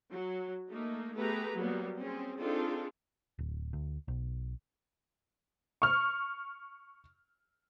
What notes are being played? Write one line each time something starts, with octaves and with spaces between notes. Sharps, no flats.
F#3
A3 A#3 D#4
A3 B3 G4 G#4 B4 A#5
F#3 G3 A#3 B3
C4 C#4 G#4
C4 D4 D#4 F4 G#4 A4
D1
D2
B1
C#6 F6